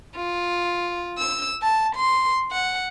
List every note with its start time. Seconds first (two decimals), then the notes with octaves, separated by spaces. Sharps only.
0.16 F4
1.18 E6
1.62 A5
1.95 C6
2.51 F#5